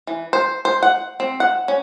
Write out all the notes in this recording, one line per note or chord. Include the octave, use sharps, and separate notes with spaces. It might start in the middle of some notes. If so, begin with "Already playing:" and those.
E3
C5
C5
F#5
C4
F#5
C#4